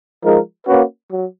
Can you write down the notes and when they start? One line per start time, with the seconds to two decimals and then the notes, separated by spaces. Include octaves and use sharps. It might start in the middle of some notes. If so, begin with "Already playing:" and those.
0.23 F3 G#3 D#4 A#4
0.66 A#3 C#4 F#4 B4
1.09 F#3